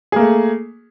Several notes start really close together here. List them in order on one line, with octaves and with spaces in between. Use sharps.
G#4 A#3 A3